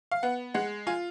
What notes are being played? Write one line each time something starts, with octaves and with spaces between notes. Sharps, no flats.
F5
B3 F#5
G#3 F#5
F4 G#5